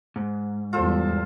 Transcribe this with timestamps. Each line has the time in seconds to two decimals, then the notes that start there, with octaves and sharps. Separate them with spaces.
0.16 G#2
0.73 E2 G3 F4 A4 C5